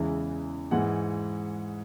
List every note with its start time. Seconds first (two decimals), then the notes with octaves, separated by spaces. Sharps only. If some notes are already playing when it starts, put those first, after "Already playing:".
Already playing: E2 C#3 E3 G#3 E5
0.71 G#2 E3 G#3 F#5